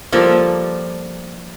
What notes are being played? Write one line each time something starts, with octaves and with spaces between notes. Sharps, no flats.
F3 G3 A#3 A4